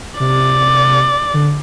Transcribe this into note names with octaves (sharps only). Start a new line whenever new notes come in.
C3 D5
D3